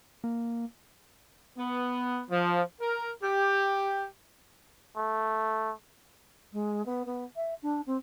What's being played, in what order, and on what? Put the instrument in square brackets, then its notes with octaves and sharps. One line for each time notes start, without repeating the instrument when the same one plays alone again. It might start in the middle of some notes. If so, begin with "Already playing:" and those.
[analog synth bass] A#3
[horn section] B3
F3
A#4
G4
[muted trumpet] A3
[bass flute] G#3
B3
B3
E5
D4
C4